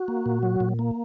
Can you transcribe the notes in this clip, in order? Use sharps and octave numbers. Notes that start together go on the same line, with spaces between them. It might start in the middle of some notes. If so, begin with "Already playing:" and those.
Already playing: F#4
A#3
A#2
F#3
A#2
A#3